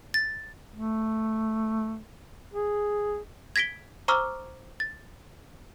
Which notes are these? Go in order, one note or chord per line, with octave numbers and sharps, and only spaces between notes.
A6
A3
G#4
G#6 A#6 B6 D7 G7
C5 A#5 C#6 D6 E6 F6
A6